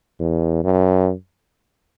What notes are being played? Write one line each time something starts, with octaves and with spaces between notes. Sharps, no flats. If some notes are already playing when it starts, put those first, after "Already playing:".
E2
F#2